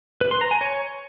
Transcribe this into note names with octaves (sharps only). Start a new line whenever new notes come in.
B4
C6
A#5
G#5
C#5